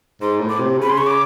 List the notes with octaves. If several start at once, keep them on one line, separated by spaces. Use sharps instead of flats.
G#2 C6
A2
D6
C3
C#3 B5
C6
C#3 C#6
D6